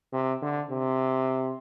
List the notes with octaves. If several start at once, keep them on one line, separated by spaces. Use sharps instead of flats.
C3
D3
C3